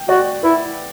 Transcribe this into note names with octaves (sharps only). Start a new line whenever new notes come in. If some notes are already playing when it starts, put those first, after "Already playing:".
Already playing: G5
F#4 D5 F#5
E4 B4